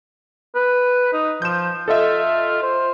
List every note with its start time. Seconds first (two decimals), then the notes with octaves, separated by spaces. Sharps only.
0.55 B4
1.13 D#4
1.42 F3 G6 E7
1.88 F4 A4 D#5 E5
2.62 C5